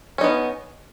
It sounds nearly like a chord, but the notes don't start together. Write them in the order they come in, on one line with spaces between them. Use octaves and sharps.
C#4 D#4 B3